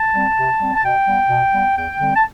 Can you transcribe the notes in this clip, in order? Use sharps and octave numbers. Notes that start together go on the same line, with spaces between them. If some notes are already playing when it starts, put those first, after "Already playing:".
Already playing: A5
G3 C4
C3
G3 C4
A5
B2 G5
G3 B3
B2
G3 B3
E2 G5
D3 G3 C4
A5